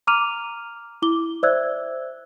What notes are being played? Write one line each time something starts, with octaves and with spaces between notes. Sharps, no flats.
A#5 D6 F6 D#7 F7
E4 D6 G7
C5 D5 E5 E6 F#6 G#6